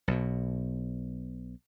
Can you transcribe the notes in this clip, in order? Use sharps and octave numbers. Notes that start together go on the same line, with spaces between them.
B1 B2